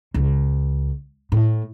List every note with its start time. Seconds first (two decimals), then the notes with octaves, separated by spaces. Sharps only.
0.14 C#2
1.32 A2